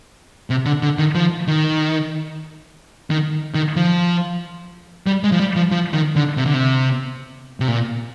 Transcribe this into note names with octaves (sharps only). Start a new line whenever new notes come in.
C3
D3
D3
D#3
F3
D#3
D#3
D#3
F3
G3
G#3
F3
G3
F3
F3
D#3
D3
C3
D3
C3
C3
A#2